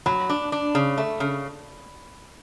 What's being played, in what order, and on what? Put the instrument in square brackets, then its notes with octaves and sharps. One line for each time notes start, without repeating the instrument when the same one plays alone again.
[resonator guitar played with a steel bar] F#3 [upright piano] B5
[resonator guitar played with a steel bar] D4
D4
C#3
A3
C#3